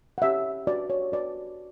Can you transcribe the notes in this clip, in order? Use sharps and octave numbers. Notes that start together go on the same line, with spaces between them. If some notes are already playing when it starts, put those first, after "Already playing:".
F#5
C#4 G4 C#5 E5
F#4 B4 D5
C#5
F#4 B4 D5